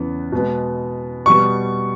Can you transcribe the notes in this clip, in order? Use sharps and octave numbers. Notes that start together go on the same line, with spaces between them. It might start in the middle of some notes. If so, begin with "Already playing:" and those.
Already playing: E2 C#3 B3
B2 G#3 B3
B2 G3 B3 C#6